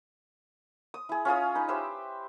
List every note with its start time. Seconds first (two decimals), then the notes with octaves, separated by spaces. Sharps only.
0.94 D#6
1.09 E4 G#4
1.25 C#4 F4 G#4 D#6
1.55 D#4 B5
1.68 G4 B4 C5 E5